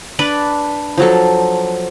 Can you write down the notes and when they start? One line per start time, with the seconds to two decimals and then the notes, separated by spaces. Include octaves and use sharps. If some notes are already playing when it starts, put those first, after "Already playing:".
0.19 D4 B4 D5 B5
0.97 F3 F#3 A4